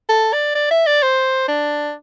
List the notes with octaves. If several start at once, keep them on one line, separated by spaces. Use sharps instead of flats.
A4
D5
D5
E5
D5
C5
D4